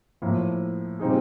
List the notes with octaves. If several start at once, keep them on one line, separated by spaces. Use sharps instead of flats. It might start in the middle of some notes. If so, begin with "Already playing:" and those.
A2 F3 A#3
A#2 G3 C4 D#4 G#4